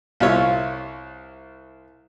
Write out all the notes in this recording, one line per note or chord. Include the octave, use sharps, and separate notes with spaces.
C2 F4 C#5 E5